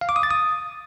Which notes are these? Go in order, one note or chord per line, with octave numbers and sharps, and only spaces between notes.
F5
D6
D#6
A6
D#6